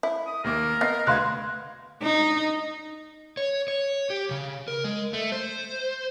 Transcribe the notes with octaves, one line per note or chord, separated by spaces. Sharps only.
E4
D#6
D#2 A#3 A#4 D6
B3 D#5 C7
D2 B4 F5 C6 F#6 G#6
D#4
C#5
C#5
G4
C#3
A#4
G#3
A3
C5